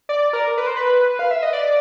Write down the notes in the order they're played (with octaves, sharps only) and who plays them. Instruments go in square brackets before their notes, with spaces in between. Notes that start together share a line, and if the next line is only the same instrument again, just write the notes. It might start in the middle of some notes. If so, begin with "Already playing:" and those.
[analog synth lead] D5
A#4
B4
C5
B4
F5
E5
D#5
D5